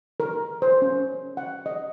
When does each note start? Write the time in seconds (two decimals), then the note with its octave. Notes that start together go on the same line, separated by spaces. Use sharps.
0.20 A#4
0.62 C5
0.82 C#4
1.37 F#5
1.66 D#5